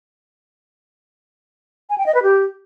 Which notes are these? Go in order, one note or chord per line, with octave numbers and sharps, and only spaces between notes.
G#5
G5
D#5
B4
G4